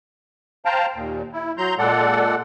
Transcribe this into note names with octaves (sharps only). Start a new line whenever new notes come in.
C5 F5 G5 A5 A#5
D#2 A#2
E4
F#3 A#5 C6 G6
A#2 G#3 A4 D5 F#5